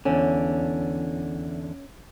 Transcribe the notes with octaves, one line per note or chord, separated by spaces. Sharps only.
E2 D3 C#4